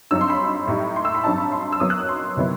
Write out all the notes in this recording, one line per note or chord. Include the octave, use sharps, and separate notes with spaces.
G2 F#3 C4 D#4 E6
C6
B5
A2 G3 D#4
C6
E6
B5
G2 F#3 C4 D#4 A5
B5
C6
E6
F#2 F#3 B3 D#6
F#6
E6
C6
C3 D#3 F#3 B3 E4